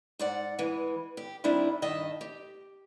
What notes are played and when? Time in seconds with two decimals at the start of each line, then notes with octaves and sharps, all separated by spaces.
0.19 G#2 D5 F#5
0.59 E3 G#3
1.17 G4
1.44 D#3 G3 C4 D4 E4
1.82 G2 D#3 D#5 E5 A5
2.21 G4